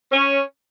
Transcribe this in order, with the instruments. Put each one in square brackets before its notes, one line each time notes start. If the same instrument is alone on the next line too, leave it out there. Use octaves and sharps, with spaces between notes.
[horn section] C#4